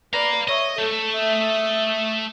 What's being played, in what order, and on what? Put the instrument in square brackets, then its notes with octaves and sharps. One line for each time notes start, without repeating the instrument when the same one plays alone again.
[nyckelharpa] B4 D5 [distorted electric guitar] F5 A#5
[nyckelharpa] C#5 E5 [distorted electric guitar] D#5
[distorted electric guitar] A3 [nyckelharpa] A4
[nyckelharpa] E5 D#6